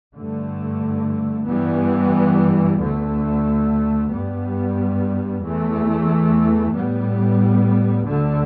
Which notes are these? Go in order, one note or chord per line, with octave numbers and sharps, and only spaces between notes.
G2 D3 A3
G2 E3 G3 B3
D2 D3 A3
G2 G3 B3
E2 E3 A3
A2 G3 B3
D2 D3 A3